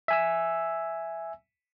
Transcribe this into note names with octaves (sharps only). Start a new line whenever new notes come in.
E5 G#5 E6